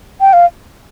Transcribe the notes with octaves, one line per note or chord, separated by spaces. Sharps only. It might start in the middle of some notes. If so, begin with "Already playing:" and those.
G5
F5